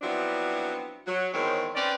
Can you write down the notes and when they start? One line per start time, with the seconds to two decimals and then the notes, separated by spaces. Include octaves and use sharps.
0.02 F3 F#3 B3 C4 D4 E4
1.06 F#3
1.33 E2 G#2 D#3 C4 C#5
1.75 C4 C#4 B4 D5